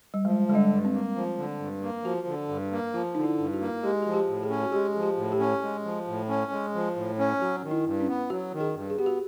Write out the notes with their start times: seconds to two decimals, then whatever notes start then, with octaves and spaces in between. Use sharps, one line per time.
0.14 G3
0.25 F3 G#3
0.48 D3 G#3
0.55 G3
0.70 G2
0.85 C4
0.93 A#3
1.15 F3
1.38 D3
1.59 G2
1.82 A#3
2.04 F3 F#4
2.27 D3
2.49 G2
2.72 A#3
2.94 F3 F4
3.15 D3 D#4
3.24 E4
3.38 G2
3.53 F#4
3.61 A#3
3.83 G#3 G4
4.02 F3 F#4
4.14 G4
4.28 A2
4.43 G#4
4.50 C#4
4.62 F#4
4.72 G#3 G4
4.93 F3 G#4
5.03 G4
5.17 A2
5.32 G4
5.40 C#4
5.62 G#3
5.85 F3
6.07 A2
6.29 C#4
6.52 G#3
6.74 F3
6.96 A2
7.19 C#4
7.41 F#3 F#4
7.63 D#3
7.71 E4
7.86 G2
8.00 C#4
8.08 B3
8.30 F#3 F#4
8.53 D#3
8.60 G#4
8.75 G2
8.90 G#4
8.97 B3 G4
9.06 F#4